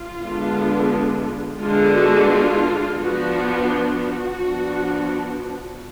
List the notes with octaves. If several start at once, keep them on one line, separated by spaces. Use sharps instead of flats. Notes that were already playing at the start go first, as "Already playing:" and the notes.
Already playing: F4
D3 G#3 B3 D4
D3 G#3 B3 D4 F4
F#4
F4
F3 B3 D4 F#4
F#4
F3 B3 D4